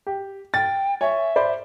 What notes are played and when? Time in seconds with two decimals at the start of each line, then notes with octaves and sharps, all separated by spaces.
0.07 G4
0.54 G5 A6
1.01 C#5 E5 G#5
1.36 C5 D5 B5